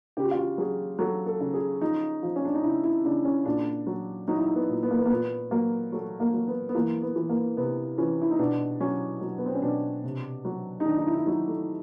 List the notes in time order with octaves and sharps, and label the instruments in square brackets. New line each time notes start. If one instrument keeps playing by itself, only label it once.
[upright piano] C#3 G4
F#4
F4
F#4
F#3 G#4
F#3 A4
A4
C#3
G#4
F3 D#4
F3
C#4
D4
D#4
C#3 E4
E4
C#3 D4
C#4
A#2 D4
F#3
F#3 D#4
E4
D#4
B3
A#2
B3
A#3
B3
A#3
A#2 B3
F#3 A#3
F#3 A3
A#3
F#3
B3
B3
E3 A#3
B3
E3
A#3
C3 B3
E3 C#4
E4
D#4
B2 D4
F#3 C#4
F#3
B3
C4
C#4
B2 D4
C3
F#3
D#4
D#3 D4
D#4
E4
E4
F#3 D#4
A3